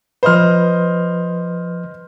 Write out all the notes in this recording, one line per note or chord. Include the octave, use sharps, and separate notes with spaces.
F3 B4 C5 D#5 F6